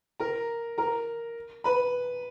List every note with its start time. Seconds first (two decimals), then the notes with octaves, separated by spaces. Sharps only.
0.20 A#4 A#5
0.78 A#4 A#5
1.64 B4 B5